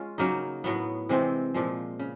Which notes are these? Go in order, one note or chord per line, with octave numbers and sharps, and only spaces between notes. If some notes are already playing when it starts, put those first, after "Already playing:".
Already playing: G#3 C#4 F4
C#3 F#3 A#3 D#4
A2 F#3 B3
C3 E3 G#3 C4
A#2 F3 G#3
C#3